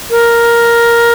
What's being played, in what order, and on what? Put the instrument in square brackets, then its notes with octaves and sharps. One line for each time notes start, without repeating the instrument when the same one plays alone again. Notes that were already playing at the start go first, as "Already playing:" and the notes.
[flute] A#4